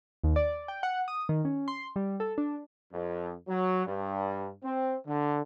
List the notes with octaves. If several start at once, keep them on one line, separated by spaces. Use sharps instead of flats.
D#2
D5
G5
F#5
D#6
D#3
C#4
C6
G3
A4
D4
F2
F#3
G2
C4
D3